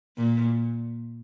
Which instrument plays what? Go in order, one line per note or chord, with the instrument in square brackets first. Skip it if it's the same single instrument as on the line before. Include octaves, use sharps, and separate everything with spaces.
[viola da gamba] A#2